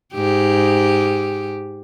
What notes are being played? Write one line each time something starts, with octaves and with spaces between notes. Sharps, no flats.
G#2 G4